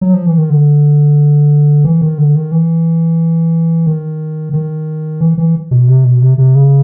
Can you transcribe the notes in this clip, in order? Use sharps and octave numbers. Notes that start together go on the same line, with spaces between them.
F#3
F3
E3
D#3
D3
E3
D#3
D3
D#3
E3
D#3
D#3
E3
E3
B2
C3
B2
C3
C3
C#3